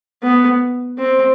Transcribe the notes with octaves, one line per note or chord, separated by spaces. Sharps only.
B3
C4